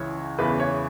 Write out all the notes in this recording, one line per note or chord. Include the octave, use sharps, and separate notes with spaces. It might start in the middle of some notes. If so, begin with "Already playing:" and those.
Already playing: C#2 C#3 E3 C#5
E2 C#3 E3 B4
C#5